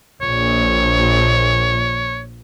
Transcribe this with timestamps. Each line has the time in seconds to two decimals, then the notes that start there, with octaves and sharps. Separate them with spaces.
0.22 A#1 C#5